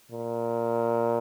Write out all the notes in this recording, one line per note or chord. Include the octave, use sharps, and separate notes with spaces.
A#2